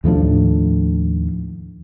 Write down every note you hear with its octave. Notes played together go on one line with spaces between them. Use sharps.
D#2 A2 F3 D4